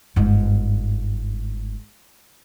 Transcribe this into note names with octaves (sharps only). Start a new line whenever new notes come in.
G1 G#2